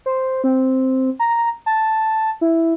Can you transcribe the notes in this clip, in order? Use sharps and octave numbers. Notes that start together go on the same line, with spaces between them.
C5
C4
A#5
A5
E4